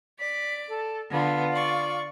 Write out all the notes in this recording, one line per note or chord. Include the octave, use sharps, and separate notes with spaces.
D5 B6
A4
D3 B3 F4
D5 C#6